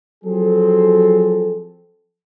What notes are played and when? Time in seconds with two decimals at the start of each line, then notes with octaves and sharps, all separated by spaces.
0.25 F3 F#3 C4 G#4 A4